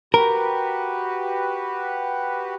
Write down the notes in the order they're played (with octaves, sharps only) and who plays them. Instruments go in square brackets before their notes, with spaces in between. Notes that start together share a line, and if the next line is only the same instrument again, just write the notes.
[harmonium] F#4 G4 B4 [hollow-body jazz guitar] A#4